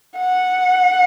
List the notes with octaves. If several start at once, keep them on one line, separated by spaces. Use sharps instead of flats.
F#5